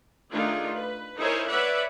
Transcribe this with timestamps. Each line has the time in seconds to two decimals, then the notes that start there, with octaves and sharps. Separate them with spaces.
0.33 D#3 A3 D4 D#4 F4 G#4
0.75 B4
1.18 D#4 E4 A#4 C5 C#5 G#5
1.48 B4 C#5 D5 E5 F#5 B5